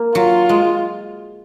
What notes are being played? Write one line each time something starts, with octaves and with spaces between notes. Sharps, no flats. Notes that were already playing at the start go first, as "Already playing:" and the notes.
Already playing: A#3
F#3 F4
G#3